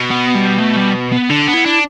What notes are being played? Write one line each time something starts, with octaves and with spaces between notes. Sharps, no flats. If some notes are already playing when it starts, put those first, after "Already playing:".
Already playing: B2
B3
G3
A3
G3
B3
D3 D4
B3
E4
D4